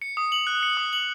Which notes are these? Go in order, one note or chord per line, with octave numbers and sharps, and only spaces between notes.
C#7
D#6
F#7
F#6
C#7
D#6
F#7